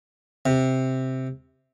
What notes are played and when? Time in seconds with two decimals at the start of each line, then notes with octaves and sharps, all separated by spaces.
0.46 C3